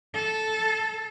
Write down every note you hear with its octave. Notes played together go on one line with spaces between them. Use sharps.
A4